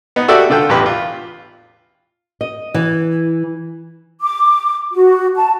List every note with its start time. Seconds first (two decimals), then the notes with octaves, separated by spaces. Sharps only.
0.16 B3 D#4
0.28 F#4 G4 A4 D5 E5 G5
0.50 D3 F4 A4 G5
0.69 A1 E2 G4 B4
0.86 F4
2.41 D#5
2.74 E3
4.22 D6
4.92 F#4
5.36 A5